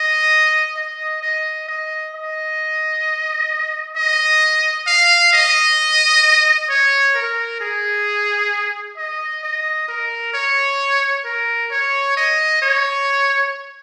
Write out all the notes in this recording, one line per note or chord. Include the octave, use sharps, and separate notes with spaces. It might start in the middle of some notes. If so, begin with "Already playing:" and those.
Already playing: D#5
D#5
D#5
D#5
D#5
D#5
F5
D#5
C#5
A#4
G#4
D#5
D#5
A#4
C#5
A#4
C#5
D#5
C#5